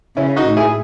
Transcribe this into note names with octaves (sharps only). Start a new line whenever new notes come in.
C#3 C#4 E4
D#4 F#4
A2
E4 G#4